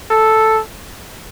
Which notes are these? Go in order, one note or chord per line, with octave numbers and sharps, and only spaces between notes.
A4